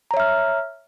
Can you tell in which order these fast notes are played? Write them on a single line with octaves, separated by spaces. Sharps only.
A#5 C#5 E5 F6